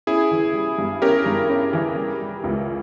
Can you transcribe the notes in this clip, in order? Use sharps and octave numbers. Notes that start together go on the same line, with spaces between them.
C#4 E4 G#4
E3
G3
G2
C#4 G4 A#4
G2
C#4
E3
G3
G3
C#2